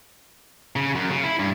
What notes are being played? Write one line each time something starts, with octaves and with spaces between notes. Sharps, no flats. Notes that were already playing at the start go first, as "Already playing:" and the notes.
C#3
F#2
C#3
E4
G2